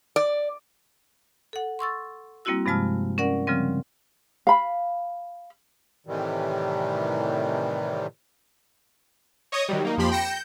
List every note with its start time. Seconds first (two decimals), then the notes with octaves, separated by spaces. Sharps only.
0.16 D5
1.53 A4 F#5
1.79 C6 C#6 E6 A6
2.45 G3 A#3 C4 E4 F#4 E6
2.66 G2 C3 F3 G#3 A5 F6
3.18 C#4 A#4 D5 F#5
3.47 C#3 F3 G3 C4
4.47 F5 B5
6.07 A2 C3 D#3 E3 G3
9.52 C#5 D#5 C#6 D#6
9.69 D#3 F#3 G3
9.85 A#3 D#4
9.97 F2 F3 A#3 G4 B5 C6
10.12 G5 A#6 C#7 E7
10.30 G6